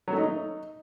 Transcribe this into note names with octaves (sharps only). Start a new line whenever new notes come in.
F#3
A3
D#4